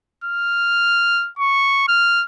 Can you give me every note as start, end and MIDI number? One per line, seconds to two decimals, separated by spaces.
0.24 1.30 89
1.39 1.86 85
1.88 2.25 89